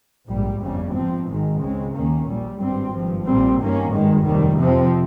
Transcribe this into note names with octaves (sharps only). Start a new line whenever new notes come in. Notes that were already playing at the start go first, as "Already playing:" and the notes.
A#1 G#2 G3
G1 F2 C#3 G3
G#2 F3 C4
G#1 G#2 D#3 G#3
C#2 C#3 G#3 C4
D#2 D#3 A#3 C#4
A#1 A#2 G3
G#1 G2 G3 C4
G#1 G2 F3
A#1 A#2 G3 C4
G2 D#3 A#3 C#4
G#1 G2 D#3 G#3
F1 D#2 D#3 G3
F2 C3 F3 C4